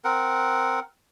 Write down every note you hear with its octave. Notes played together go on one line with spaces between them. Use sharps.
C4 A#4 F#5